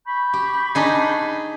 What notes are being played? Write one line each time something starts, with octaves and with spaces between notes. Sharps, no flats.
B5 C#6 G6
G4
D4 D#4 G#4